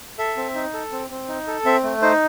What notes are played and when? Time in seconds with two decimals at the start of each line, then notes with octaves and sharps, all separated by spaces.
0.19 A4 E5
0.37 C4
0.55 D#4
0.74 A4
0.92 C4
1.10 C4
1.28 D#4
1.48 A4
1.65 C4 E5
1.83 A3
2.02 D#4 C5